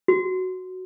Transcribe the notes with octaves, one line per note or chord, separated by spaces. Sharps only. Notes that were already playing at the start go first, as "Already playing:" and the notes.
F#4